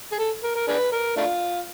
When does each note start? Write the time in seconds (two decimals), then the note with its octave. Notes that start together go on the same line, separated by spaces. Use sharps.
0.12 G#4
0.19 A4
0.43 A#4
0.55 A#4
0.68 D4 G#4 B4
0.92 A#4
1.17 A3 D4 F4